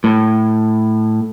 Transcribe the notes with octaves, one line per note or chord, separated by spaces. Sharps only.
A2